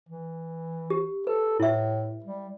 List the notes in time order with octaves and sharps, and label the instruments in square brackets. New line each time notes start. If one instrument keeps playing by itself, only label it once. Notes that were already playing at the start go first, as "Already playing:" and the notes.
[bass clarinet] E3
[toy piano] G4
[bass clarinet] A4 [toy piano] B4
[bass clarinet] A2 [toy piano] E4 E5
[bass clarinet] G3